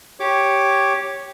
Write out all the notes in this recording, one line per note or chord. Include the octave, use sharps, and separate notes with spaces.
G4 C#5 D6